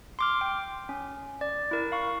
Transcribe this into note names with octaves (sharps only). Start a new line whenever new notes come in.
C6 D6 F6
G5
C#4
D5
E4 A#4
F5 C#6